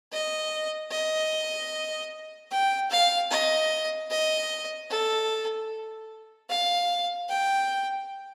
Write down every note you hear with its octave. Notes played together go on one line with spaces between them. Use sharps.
D#5
D#5
G5
F5
D#5
D#5
A4
F5
G5